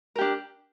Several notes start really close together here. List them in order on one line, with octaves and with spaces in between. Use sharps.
A#4 G4 D4